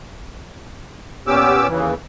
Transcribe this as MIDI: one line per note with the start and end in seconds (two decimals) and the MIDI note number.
1.27 1.67 46
1.27 1.67 59
1.27 1.67 61
1.27 1.67 67
1.27 1.67 86
1.27 1.67 88
1.68 1.94 39
1.68 1.94 49
1.68 1.94 52